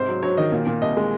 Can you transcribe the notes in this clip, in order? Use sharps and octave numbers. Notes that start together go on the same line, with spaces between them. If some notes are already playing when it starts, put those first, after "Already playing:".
Already playing: G#2 C3 C5
F#3
F#3 C#5
D#3 D#5
A#2
A#2
C2 D#5
G#3